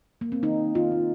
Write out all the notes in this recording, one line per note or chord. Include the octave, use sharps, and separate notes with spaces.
A#3
C4
D#3 D#4
D#3
D#3 F4
A#3